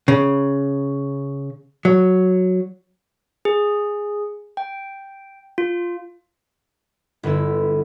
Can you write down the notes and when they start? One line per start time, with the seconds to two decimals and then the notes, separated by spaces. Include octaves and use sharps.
0.08 C#3
1.85 F#3
3.45 G#4
4.57 G5
5.58 F4
7.23 G1 D3 B3 E4 E6